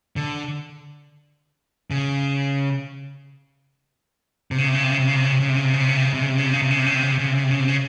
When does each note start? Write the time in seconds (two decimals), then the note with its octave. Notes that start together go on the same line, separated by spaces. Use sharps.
0.16 D3
1.91 C#3
4.51 C3
4.58 C#3
4.68 C3
4.75 C#3
4.83 C3
4.92 C#3
4.99 C3
5.08 C#3
5.16 C3
5.24 C#3
5.32 C3
5.40 C#3
5.49 C3
5.56 C#3
5.64 C3
5.73 C#3
5.81 C3
5.89 C#3
5.97 C3
6.05 C#3
6.14 C3
6.22 C#3
6.29 C3
6.38 C#3
6.46 C3
6.53 C#3
6.62 C3
6.71 C#3
6.78 C3
6.86 C#3
6.94 C3
7.03 C#3
7.11 C3
7.18 C#3
7.27 C3
7.35 C#3
7.44 C3
7.51 C#3
7.60 C3
7.68 C#3